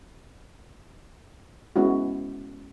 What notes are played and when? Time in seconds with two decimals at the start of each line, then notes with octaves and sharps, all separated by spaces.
1.76 G#3 B3 C#4 E4 F#4